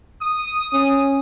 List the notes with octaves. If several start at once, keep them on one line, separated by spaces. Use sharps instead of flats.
D#6
C#4